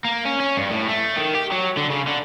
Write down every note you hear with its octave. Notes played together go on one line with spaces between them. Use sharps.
A#3
C#4
C#4
G2
A2
A3
D#3
G4
F#3
D3
C#3
D3